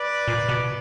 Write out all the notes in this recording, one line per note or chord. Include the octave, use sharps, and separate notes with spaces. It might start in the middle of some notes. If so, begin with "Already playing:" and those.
Already playing: B4 D5
A#2
B2